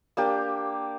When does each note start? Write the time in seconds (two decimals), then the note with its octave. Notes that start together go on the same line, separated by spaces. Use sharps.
0.17 A#3 D4 G4